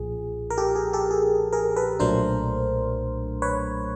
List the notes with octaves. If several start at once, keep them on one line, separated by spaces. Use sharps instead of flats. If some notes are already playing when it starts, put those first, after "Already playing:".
Already playing: B1 A#2 F3 G#4
A#4
G4 A4
G#4
G4 A4
G#4
G#4 A#4
A4 B4
B1 A#2 F#3 A3 D4 A#4 C5
B4 C#5